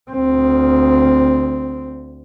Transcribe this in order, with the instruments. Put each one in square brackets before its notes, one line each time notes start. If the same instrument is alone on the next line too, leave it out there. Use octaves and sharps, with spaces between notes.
[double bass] D2 C4